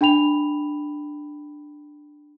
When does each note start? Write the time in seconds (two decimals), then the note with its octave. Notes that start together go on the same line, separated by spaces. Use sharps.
0.01 D4 G5 B5 F7